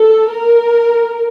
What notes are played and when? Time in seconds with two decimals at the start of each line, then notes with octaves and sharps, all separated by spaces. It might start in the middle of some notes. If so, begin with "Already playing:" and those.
Already playing: A4
0.30 A#4